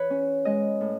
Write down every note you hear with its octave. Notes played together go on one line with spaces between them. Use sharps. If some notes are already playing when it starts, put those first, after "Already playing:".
Already playing: E3 B4 C#5
C#4
G#3 D#5
A2